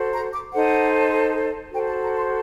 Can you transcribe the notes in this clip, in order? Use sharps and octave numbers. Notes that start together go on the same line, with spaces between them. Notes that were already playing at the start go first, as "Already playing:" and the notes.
Already playing: F#4 A4 C5
A#5
D6
D#4 A4 C5 F#5
F#4 A4 C5 G5
A5
A#5
C6